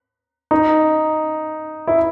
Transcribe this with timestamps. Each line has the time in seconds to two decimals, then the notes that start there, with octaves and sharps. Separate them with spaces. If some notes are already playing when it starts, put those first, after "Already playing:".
0.51 D#4
1.87 E4